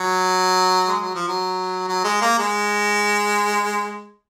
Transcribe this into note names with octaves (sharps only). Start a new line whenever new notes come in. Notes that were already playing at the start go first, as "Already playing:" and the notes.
Already playing: F#3
G#3
F#3
F3
F#3
F#3
G#3
A#3
G#3